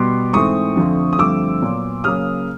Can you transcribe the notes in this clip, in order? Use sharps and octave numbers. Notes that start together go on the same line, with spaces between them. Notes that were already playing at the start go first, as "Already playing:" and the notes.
Already playing: B2 G3 B3 C6 D6
G#2 E3 A3 C4 C#6 D#6
F2 D3 F3 A3 C4
D#6
G2 D3 F3 A3 C4 D6 E6
A#2 F#3 B3
C#3 F#3 A#3 D#6 F6